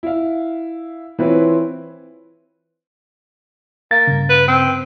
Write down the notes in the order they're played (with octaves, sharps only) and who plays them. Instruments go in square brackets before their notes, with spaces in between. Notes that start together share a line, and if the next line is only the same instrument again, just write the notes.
[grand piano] E4 F5
E3 C4 E4 F4 B4 C#5
[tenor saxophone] A#3 [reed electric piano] A6
[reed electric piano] G2 C#3
[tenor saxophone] B4
C4